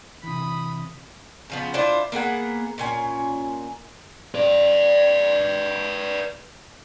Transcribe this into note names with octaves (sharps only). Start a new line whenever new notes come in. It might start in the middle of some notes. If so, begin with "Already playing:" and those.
C3 E3 B5 D#6
C#3 F3 B3
D4 E4 F4 C5
A#3 B3 G#4 F#5
A#2 C#4 G#5
B4 D5